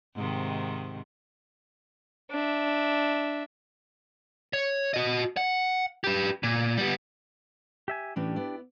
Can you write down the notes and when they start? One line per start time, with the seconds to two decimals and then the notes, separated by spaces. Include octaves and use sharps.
0.15 G#2 C3 D#3
2.31 D4 E5
4.53 C#5
4.94 F#4 D#5
5.37 F#5
6.04 G4 B4
6.43 A#2
6.77 G3 B3
7.88 G4 E5 G#5
8.16 A2 E3 C#4 D4 G4
8.36 B3 E4 D5